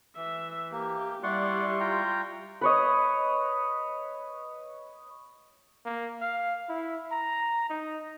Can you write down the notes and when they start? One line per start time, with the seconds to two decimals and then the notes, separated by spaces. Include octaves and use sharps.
0.16 E3 E5
0.72 A#3 G4
1.23 G3 E4 D5 F#5 C6 C#6
1.80 F4 G5 A#5
2.61 B4 C#5 D#5
5.85 A#3
6.21 F5
6.69 E4
7.11 A#5
7.70 D#4